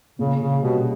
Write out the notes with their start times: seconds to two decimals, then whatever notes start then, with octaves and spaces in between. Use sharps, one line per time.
0.19 A#2 C#3
0.41 C#3
0.62 B2 G3 C#4 G4